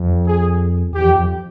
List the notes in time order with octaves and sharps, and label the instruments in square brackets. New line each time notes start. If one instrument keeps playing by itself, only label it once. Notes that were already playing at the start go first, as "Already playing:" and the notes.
Already playing: [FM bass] F2
[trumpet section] G#4
[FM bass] E2 [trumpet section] G4
[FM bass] F2
F2